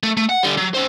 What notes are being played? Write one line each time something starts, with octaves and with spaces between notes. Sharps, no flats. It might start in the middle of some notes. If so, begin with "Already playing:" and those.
A3
A3
F#5
D3 G3
F#3
C#4 C5